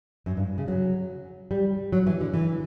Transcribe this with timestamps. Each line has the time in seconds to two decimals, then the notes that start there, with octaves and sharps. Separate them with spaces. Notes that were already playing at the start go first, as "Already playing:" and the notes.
0.26 F#2
0.37 G2
0.58 C#3
0.68 F#3
1.51 G3
1.92 F#3
2.07 E3
2.21 D3
2.34 E3